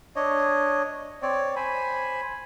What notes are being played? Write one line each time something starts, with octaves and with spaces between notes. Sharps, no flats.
D4 C#5 D#5
C4 C#5 D5
C5 G#5 B5